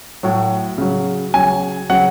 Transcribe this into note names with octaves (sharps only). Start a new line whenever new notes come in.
A2 F#3
C#3 F#3
C#3 F#3 G#5
C#3 F#3 F#5